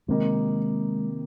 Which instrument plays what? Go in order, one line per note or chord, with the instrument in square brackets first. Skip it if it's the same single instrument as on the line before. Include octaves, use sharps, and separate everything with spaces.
[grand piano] C3 D#3 A#3 D#4 [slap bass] G#3